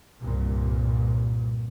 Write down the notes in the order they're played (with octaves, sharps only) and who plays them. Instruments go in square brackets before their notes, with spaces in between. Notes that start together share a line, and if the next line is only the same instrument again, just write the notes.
[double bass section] C2 G2 A#2